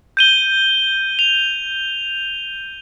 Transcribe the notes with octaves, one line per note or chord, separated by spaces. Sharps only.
G6 D#7 G7
F7